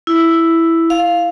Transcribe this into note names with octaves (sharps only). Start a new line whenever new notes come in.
E4
F5